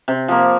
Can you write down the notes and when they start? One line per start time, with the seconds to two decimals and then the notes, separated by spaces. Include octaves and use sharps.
0.08 C3
0.28 F3 A#3